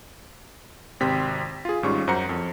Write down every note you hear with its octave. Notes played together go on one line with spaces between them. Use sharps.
G#1 C3 G5 C6 B6
F4 G#4
G#1 G#2 G3 C#4 F4 C#6
F#2 C5 F#5 A#5 C#7
F2